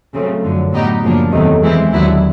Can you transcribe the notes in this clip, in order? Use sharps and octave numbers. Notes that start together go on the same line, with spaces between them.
C#3 F#3 A3 C4
F#2 D3 F3
A2 F#3 B3 D#4 G4
F#2 C#3 F3 A#3 D4
E2 C3 D#3 F#3 A3
E3 G#3 C4 E4
D#2 D3 F#3 B3 E4